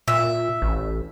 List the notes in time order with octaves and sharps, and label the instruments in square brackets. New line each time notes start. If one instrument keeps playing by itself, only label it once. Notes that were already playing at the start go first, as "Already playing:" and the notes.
[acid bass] A#2 [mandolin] E5
[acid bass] A1